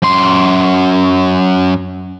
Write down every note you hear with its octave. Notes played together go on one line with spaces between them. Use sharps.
F#2 C6